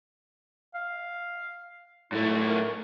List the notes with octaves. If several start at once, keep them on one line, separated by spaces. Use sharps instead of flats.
F5
F#2 A2 A3 E4
A#4